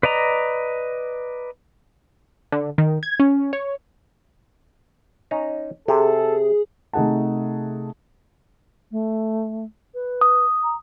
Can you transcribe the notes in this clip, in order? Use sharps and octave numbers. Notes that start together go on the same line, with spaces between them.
B4 D5 D#5 A#5
D3
D#3
G#6
C#4
C#5
C#4 D#4 A#5
C3 G#4 A4
C3 A3 D#4 G#4 F#5 A5
A3
B4
D#6
A#5